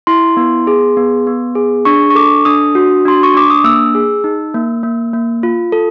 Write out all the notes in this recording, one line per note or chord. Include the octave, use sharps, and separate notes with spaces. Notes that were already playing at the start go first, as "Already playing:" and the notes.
E4 C6
B3
G#4
B3
B3
G#4
D4 C#6
C#6
A4 D6
D4 D#6
F#4
D4 C6
C#6
D4 D6
D#6
A#3 E6
G#4
D#4
A#3
A#3
A#3
F4
A4